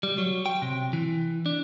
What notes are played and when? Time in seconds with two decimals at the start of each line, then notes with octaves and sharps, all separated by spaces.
0.03 G3
0.18 F#3
0.46 G5
0.62 C3
0.93 E3
1.46 D4